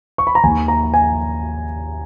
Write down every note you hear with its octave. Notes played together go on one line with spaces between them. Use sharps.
C#6
B5
A#5
D#2 D#3 G#5
A#5
G#5